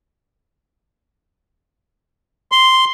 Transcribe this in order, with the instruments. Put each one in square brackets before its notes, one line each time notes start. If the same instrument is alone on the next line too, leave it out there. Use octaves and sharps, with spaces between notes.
[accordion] C6